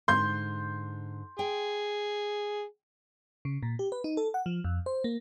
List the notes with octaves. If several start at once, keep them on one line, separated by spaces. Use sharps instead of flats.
G#2 D3 C6 G6
G#4 G5
C#3
A#2
G4
B4
D#4
A4
F#5
F3
F2
C5
A#3